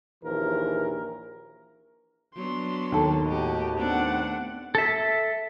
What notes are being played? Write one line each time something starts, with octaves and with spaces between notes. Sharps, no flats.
A#1 D#2 E3 A#4
F#3 B3 D4 C6
D#2 A4
A2 F#4 G4 D#5
A3 B3 C4 D4 F#5
A4 E5